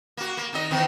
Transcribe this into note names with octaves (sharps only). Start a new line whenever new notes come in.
A#3 F#4
A#3
D#3 D#4 D#5
E2 D#3 C4